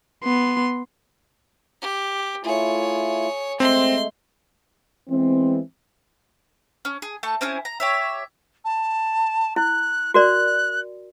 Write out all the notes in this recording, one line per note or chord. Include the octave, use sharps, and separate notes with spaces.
B3 C6
G4
A3 E4 F4 G#4 C#5
G#3 A3 C4 C6
E3 G#3 B3 C4
C#4
G#4
A3 A5 C#6
C4 C#4 E4 G#4
A#5
G4 C#5 E5
A5
E4 F#6
F#4 A#4 D5 F#6